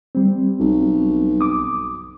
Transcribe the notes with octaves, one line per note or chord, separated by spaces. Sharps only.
G3 C4
B1
D6 D#6